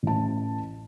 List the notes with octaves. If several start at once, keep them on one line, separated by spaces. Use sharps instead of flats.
A1 A5